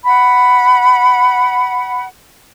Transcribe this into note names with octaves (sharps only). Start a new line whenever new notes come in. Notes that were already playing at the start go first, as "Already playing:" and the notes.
F#5 B5